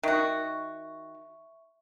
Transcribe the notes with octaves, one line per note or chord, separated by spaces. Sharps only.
D#3 F#4 E5 C#6